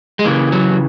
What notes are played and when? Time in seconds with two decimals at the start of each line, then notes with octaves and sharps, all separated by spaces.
0.19 G#3
0.25 C#3 E3 A#3
0.52 F#3